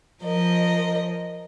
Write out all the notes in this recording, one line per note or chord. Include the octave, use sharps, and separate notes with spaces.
F3 A#4 D#5